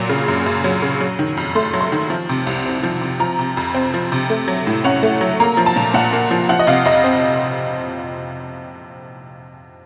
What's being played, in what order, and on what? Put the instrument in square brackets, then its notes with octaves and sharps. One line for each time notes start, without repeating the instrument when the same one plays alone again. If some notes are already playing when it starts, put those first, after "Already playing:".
Already playing: [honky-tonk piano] A#2 F#3
C#3
F#2
F#2
F#3
C#3
F#3
D#3
F2
A3 C6
F#3
C6
D#3
F3
C3
C2
C4
F3
C3
F3 A#5
C3
F2
C4
F3
C3
A3
F#3
A2
C#4 F#5
A3
F#3
A#3 A#5
F3
A5
A#2
A#2 F#5
A#3
F3
F3 F#5
D#5
C3 F5
F2 D#5
C4